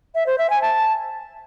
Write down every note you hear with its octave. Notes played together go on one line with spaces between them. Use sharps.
E5
C5
E5
G#5
A5